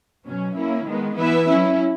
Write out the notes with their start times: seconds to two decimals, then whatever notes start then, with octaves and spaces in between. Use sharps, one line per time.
0.24 B2 F#3 C#4
0.55 A#3 C#4 E4
0.86 D#3 G#3 B3
1.17 E3 B3 E4 B4 E5
1.47 F#3 C#4 E4